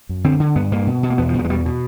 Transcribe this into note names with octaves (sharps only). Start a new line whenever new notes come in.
F#2
D3 C4
D3
G2 B3
G2 A#3
B2
B2
A#3
E2 B3
F3
E2
F3
G#3
B2 G3
B2